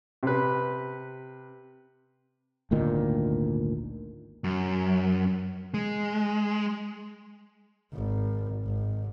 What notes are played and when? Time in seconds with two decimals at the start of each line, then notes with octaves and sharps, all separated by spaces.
0.23 C3 B4
2.71 G#1 D2 A#2 D#3
4.44 F#2
5.74 G#3
7.94 G#1
8.65 G#1